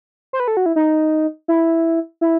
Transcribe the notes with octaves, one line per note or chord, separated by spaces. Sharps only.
C5
B4
A4
F#4
E4
D#4
E4
E4